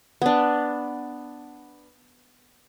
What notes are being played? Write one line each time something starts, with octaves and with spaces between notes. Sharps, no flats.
B3 D4